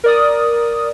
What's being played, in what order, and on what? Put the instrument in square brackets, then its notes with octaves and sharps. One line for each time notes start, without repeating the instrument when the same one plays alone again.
[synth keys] A#4 D5 D#6